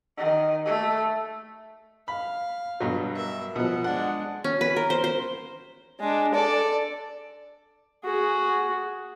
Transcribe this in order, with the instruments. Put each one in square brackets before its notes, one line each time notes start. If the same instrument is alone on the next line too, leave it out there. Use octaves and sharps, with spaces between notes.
[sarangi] D#3
A3
[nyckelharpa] F5 [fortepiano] B5
[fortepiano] G2 B2 F#3
[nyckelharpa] A#4 E5
[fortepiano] B2 F3 [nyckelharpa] F#5
[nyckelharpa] G#3 D4 [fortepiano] F#5
[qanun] C#4
B4
A#4
C5
C5
[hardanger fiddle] G#3 D4
A4 D5
[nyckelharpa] F#4 G#4